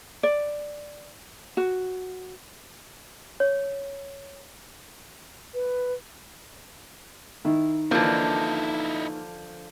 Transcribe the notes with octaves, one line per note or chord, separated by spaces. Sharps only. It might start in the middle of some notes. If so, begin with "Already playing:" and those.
D5
F#4
C#5
B4
D#3 E4
D3 E3 F3 A#3 D#4 E4